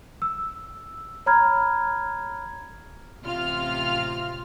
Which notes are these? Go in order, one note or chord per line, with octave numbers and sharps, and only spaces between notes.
E6
C#5 A#5 B5 F6 G#6
A1 C3 F4 F6